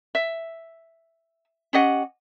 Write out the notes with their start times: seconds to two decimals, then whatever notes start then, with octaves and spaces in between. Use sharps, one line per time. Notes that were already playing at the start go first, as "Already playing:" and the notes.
0.15 E5
1.73 C#4 G4 D#5 F#5